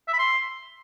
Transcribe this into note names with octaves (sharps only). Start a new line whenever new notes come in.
E5
B5
C6